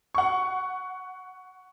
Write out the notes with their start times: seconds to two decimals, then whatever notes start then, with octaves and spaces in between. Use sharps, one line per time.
0.15 F#5 C#6